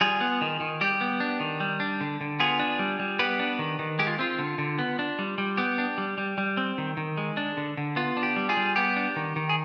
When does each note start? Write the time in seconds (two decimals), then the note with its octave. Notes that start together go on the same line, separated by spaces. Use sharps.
0.01 G3 F4 G#4
0.21 B3
0.41 D#3
0.60 D#3
0.81 G3 G4
1.01 B3
1.20 D4
1.40 D#3
1.60 G3
1.80 D4
2.01 D3
2.21 D3
2.40 B3 F4 G#4
2.59 D4
2.79 G3
2.99 G3
3.19 B3 G4 B4
3.39 D4
3.59 D#3
3.79 D#3
3.99 G#3 G4
4.07 F4
4.19 C4 F4
4.39 D3
4.58 D3
4.79 B3
4.99 D4
5.19 G3
5.38 G3
5.57 B3 G4
5.78 D4
5.98 G3
6.18 G3
6.38 G3
6.57 C4
6.78 D#3
6.97 D#3
7.17 G#3
7.37 D4
7.57 D3
7.77 D3
7.96 B3 F4
8.17 D4
8.23 G4
8.36 G3
8.49 F4 G#4
8.57 G3
8.76 B3 G4
8.96 D4
9.16 D#3
9.36 D#3
9.49 G#4